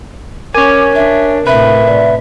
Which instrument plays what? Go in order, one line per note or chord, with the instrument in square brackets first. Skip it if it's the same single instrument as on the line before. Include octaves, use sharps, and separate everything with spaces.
[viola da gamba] C#4 [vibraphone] A#4 [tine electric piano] C#5 G#5 [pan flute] D6
[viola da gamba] D4 [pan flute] E5
[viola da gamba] A2 C3 [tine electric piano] B4 [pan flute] E5
[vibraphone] D5